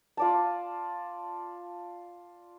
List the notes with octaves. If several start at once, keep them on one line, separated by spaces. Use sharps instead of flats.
F4 D5 A5